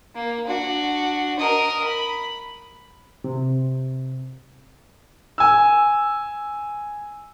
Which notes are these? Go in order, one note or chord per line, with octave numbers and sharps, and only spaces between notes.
A#3
D4 F#4
A#4 D#5
B5
C3
G#5 E6